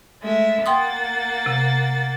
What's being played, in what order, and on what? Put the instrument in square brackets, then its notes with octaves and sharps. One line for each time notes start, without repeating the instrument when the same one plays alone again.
[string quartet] G#3 A3 E5
[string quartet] A#3 F#5 A6 [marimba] G5 C6 D#6
[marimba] C3